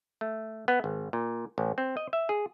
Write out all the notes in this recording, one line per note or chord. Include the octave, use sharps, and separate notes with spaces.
A3
B3
G#1
A#2
A1
C4
D#5
E5
G#4